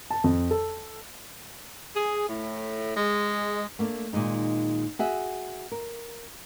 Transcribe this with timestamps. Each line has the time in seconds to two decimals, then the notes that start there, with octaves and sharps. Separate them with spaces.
0.10 A5
0.24 F2
0.51 A4
1.95 G#4
2.28 A2
2.96 G#3
3.79 A3 A#3 D4
4.13 A#2 D#3 G#3 D#4
4.99 F#4 G#4 E5
5.72 A#4